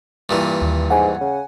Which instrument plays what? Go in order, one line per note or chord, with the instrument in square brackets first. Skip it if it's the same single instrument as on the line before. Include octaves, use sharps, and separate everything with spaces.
[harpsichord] G2 A#2 E3
[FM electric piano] D#2
[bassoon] G#2 [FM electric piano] F#5 G#5
[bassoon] C#3